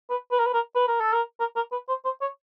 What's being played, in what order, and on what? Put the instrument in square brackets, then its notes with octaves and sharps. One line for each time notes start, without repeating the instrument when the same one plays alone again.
[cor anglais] B4
B4
A#4
B4
A#4
B4
A#4
A4
A#4
A#4
A#4
B4
C5
C5
C#5